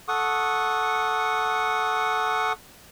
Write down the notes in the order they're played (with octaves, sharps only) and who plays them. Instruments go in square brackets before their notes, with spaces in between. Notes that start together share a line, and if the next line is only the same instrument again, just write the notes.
[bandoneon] A4 F#5 C#6 D#6